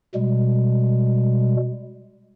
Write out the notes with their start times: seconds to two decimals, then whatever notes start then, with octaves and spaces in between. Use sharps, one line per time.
0.15 B2 G3 G#3